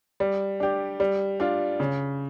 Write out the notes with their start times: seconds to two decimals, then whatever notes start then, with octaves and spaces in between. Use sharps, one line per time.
0.20 G3
0.60 D4 G4
1.00 G3
1.40 D4 F4
1.80 C#3